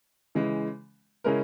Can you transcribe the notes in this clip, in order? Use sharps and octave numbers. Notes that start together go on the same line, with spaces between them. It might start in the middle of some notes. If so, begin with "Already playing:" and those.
C#3 E3 G#3
C#3 G#3 C#4 E4 A#4